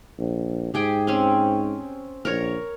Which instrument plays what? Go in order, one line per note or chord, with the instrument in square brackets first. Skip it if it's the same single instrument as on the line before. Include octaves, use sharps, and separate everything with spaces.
[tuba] A#1
[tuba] G#2 [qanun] G4 G#4 G5
[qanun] C4 C#4
[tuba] A#1 [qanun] A#4 C#5